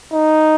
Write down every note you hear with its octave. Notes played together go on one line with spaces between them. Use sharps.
D#4